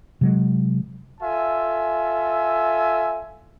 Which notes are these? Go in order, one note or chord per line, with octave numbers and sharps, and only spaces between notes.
C3 F#3 G#3
F4 A4 E5 G#5